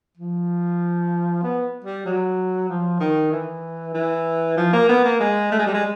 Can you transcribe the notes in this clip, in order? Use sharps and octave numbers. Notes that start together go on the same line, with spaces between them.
F3
B3
G3
F#3
F3
D#3
E3
E3
F3
A#3
B3
A#3
G#3
A3
G#3
G3
G#3